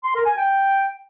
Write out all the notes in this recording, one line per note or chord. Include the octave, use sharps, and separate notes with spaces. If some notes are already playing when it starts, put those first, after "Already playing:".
C6
A#4
G#5
G5